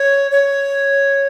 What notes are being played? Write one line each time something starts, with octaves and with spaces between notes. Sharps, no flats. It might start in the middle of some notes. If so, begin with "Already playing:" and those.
Already playing: C#5
C#5